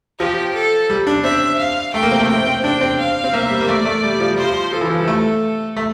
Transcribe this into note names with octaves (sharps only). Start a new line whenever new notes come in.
F3 G4
A4
G3
D4
C4 E5
F5
A3 G5
A#3
C4
A3
C4 G5
C4
D4 G5
C4
F5
C4
A#3 E5
G3
A#3
A3 D5
A3
G3
F3
G3
C5
F3
F3 A4
E3
F3
G3
A3
A3